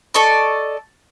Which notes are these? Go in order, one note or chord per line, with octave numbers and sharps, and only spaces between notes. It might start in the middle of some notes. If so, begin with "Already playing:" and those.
A4 D5 D#5 C#6